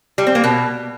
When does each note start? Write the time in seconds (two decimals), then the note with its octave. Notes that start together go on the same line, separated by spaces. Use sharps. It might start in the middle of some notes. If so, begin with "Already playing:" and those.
0.18 G3
0.27 C4
0.35 A#3
0.44 B2